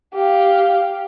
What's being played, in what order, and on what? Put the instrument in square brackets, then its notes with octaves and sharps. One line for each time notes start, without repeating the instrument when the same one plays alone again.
[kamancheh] G4 F5